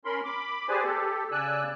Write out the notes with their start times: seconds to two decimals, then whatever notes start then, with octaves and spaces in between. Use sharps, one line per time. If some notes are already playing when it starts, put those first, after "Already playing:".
0.05 C#4 A#4 B5 C6
0.24 B5 D6
0.69 G4 G#4 B4 C5 D5 G#5
0.84 G4 A4
1.32 C#3 D5 G#5 E6 F#6